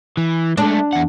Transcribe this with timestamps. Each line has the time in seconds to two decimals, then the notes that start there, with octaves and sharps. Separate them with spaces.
0.17 E3
0.57 G#3 A3 D4
0.93 E2 F#5